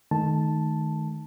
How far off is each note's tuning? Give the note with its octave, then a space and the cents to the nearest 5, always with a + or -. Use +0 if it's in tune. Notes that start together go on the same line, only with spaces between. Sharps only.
D#3 -5 A3 -30 A5 +0